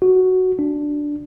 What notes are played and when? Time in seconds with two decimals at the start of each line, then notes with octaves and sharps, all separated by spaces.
0.02 F#4
0.59 D4